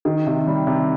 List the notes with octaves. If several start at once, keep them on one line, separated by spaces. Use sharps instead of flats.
D#3
C3
G3
C3